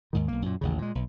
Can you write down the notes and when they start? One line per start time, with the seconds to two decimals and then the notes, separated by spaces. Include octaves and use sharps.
0.13 D#2 G#2 D#3
0.28 B1 A#3
0.42 F#2 A#2
0.61 A1 D#2 C#3
0.78 A#2 G#3
0.95 B1